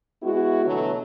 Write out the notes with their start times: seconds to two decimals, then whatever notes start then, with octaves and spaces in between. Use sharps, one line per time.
0.22 G#3 B3 E4 F#4
0.64 B2 D3 E3 F#3 A3